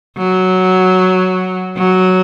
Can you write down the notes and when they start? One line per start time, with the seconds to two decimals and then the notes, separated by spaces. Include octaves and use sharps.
0.18 F#3
1.77 F#3